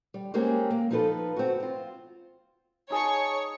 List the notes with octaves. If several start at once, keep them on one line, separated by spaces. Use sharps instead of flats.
G3
G#3 A#3 C4 C#4 G4 G#4
A#3
F3 D#4 F4 A4 B4
C4 F#4
C4 F4
D#4 G#4 C#5 A5 C#6